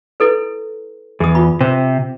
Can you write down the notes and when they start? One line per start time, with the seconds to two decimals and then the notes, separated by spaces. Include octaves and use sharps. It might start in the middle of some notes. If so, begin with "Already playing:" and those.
0.20 E4 A4 B4
1.20 E2 G#4 D#6
1.35 F4 B5
1.61 C3 C5